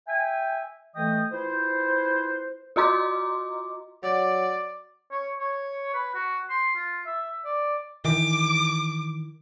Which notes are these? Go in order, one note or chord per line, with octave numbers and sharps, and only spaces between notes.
E5 G5 G#5
E3 A3 A4 D#5 G5 D#6
E4 F4 B4 C5
F4 F#4 D#5 A#5 C6 D6
F#3 D5
C#5
C#5
B4
F#4
C6
F4
E5
D5
D#3 E3 D6